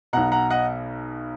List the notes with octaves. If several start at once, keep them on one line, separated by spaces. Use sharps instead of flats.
B1 B2 F#5 A#5
F#5 A#5
D#5 F#5